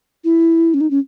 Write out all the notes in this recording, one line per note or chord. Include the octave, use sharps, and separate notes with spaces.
E4
C#4
D#4
C#4